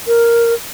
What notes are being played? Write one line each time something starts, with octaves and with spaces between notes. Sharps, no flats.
A#4